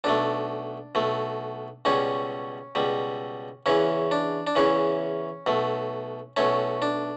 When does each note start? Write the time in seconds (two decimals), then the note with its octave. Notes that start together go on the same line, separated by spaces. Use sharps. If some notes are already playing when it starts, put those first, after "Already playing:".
0.04 B1 B2 A3 D4
0.95 B1 B2 A3
1.85 C#2 B2 G3 C#4
2.75 C#2 B2 G3
3.66 E2 C#3 E3 C#4
4.11 D4
4.47 D4
4.56 E2 C#3 E3 C#4
5.47 B1 B2 A3
6.37 B1 B2 A3 C#4
6.82 D4